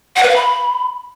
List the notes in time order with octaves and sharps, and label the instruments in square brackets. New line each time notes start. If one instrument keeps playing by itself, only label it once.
[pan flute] F#5
B4
F5
B5